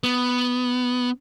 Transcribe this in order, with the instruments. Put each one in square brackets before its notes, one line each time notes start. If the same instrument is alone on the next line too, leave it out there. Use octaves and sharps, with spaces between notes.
[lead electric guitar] B3